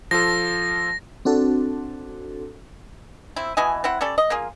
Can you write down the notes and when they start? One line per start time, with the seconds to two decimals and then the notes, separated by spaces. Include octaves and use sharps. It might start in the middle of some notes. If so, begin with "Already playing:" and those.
0.11 F3 F4 A4 A#6
1.25 C4 D4 F#4 A4
3.36 C4 E4
3.57 B2 E3 D#5 G#5
3.84 C4 E4 F#5
4.01 G3 C#4 A4 D5
4.18 D#5
4.30 A#3 F4 G#4